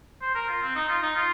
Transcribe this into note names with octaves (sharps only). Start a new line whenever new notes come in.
C5
A#4
F4
C4
D#4
F4
D#4
F4